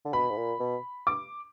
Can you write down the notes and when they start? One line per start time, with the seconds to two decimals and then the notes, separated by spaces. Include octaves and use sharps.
0.05 D3
0.13 B2 B5
0.30 G#2
0.37 A#2
0.60 B2
1.07 D6